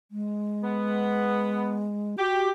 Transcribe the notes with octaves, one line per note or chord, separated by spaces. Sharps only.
G#3
B3
F#4 G4